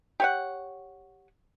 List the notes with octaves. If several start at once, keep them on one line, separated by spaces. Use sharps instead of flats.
G4 C#5 F#5